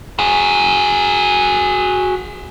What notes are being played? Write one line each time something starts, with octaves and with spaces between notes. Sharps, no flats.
F#4 G#4